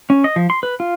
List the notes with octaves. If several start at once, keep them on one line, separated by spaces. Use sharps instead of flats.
C#4
D#5
F3
C6
B4
F4